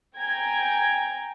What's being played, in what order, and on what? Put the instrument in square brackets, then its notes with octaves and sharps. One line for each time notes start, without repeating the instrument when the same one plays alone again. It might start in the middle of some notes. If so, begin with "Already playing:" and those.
[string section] G5 G#5 A#5 G#6